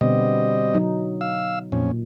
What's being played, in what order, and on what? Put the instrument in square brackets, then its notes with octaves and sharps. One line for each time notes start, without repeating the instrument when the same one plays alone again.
[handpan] B2 D3 B3 [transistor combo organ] G3 C4 D#5
[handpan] F#3 D#4
[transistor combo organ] F5 E6
[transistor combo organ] F2 C#4 [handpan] A#2